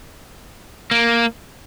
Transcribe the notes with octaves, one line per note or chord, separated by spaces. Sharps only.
A#3